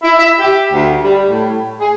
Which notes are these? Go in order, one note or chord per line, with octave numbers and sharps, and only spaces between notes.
E4
E5
G4
D2
G3
A2
G#4